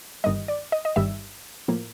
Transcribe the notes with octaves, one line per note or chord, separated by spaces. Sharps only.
G1 G2 D#3 G3 D#5
D5
D#5
D#5
G1 G2 D#3 G3 E5
A2 F3 A#3